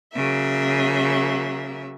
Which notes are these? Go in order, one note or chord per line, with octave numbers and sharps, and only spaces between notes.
C#3 F#3 A#3 E5